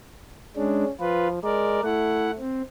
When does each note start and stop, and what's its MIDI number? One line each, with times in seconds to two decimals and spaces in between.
0.57 0.85 56
0.57 0.92 61
0.57 0.85 62
1.00 1.43 53
1.00 1.28 65
1.00 1.28 71
1.44 1.83 56
1.44 1.81 70
1.44 1.81 74
1.84 2.38 57
1.84 2.31 64
1.84 2.31 78
2.38 2.62 60